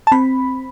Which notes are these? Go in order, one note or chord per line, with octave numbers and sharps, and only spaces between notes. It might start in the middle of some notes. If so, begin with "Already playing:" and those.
A5
C4 B5